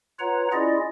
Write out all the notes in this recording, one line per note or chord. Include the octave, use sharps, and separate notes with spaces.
F4 B4 C#5 F#5 A#5
C#4 E4 F4 G#4 D5 D#5